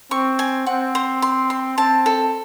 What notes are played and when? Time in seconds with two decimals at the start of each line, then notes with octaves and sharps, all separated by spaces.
0.11 C4 C#6
0.39 G#5
0.66 C4 F#5
0.95 C5
1.22 C6
1.50 C6
1.78 C4 A5
2.06 A4